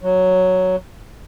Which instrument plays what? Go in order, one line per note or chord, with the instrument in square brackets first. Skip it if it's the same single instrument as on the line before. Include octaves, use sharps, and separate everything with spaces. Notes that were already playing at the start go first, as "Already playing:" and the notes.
[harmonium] F#3